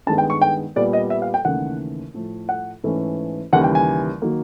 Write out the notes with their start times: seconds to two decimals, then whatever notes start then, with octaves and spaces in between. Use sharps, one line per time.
0.07 G2 D#3 G#3 B3 A5
0.18 G5
0.30 C#6
0.41 G5
0.76 A#2 G3 B3 D5
0.93 D#5
1.10 E5
1.22 F5
1.34 G5
1.45 D#2 C#3 E3 A3 F#5
2.14 A2 F3 A3
2.49 F#5
2.84 G#2 E3 A3 C#4
3.53 D#2 C#3 E3 G3 F#5
3.64 G5
3.75 G#5
4.22 D#3 F#3 A#3